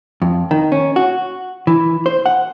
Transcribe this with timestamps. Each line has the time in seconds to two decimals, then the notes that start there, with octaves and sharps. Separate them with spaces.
0.22 F2
0.51 D#3
0.72 C#4
0.96 F#4
1.67 E3
2.06 C5
2.26 F#5